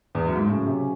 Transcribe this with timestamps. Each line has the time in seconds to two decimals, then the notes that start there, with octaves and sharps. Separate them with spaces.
0.15 E2
0.26 F#2
0.36 G#2
0.46 A2 C#3 F#3 C#4
0.67 C3